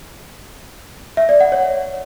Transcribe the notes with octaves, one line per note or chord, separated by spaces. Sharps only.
E5
D5
F#5
C#5